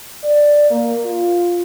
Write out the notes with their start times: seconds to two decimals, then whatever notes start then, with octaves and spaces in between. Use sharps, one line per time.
0.23 D5
0.71 A#3
1.05 F4